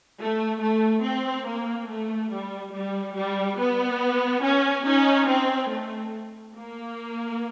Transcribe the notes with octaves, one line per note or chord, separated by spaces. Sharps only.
A3
A3
C4
A#3
A3
G3
G3
G3
B3
C#4
C#4 D#4
C4
A3
A#3